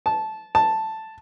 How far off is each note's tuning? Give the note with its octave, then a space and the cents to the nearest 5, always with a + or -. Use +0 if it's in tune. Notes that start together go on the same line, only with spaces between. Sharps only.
A5 -15
A5 +0